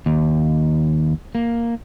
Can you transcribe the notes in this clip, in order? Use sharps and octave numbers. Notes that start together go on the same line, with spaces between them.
D#2
A#3